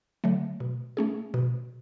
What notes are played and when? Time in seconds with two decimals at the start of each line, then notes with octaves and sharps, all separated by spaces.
0.24 D3 F#3 A3
0.60 B2
0.97 A3 C#4 G#4
1.34 B2